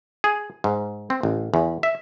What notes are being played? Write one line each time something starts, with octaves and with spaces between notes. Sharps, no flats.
G#4
G#2
C4
A1
E2
E5